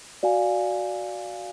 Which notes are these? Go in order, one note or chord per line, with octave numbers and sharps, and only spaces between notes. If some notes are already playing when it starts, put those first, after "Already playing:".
F#4 D5 F5 G#5